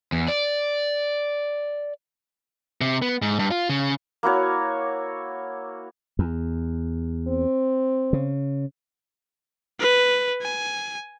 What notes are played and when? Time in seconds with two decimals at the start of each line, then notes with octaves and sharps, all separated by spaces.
0.12 E2
0.28 D5
2.81 C3
3.02 B3
3.22 G#2
3.39 G2
3.51 F4
3.70 C#3
4.23 A#3 E4 F#4 C#5
6.19 E2
7.28 C4
8.13 C#3
9.80 B4
10.42 G#5